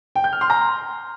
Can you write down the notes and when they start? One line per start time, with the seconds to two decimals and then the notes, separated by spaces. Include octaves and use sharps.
0.16 G5
0.24 G6
0.33 F6
0.41 C6
0.50 A#5